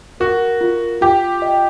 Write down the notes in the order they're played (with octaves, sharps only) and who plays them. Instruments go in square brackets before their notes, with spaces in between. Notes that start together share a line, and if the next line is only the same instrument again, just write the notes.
[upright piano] F#4 [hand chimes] A#4
[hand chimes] F4
[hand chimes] F4 [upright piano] G4
[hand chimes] D#5